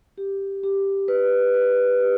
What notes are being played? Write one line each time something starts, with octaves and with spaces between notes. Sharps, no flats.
G4
G4
B4
B4
G4